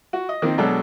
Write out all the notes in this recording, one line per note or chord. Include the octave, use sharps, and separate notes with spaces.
F#4
D#5
D#3 A#3 C4
B2 F#3 G#3 D4 A4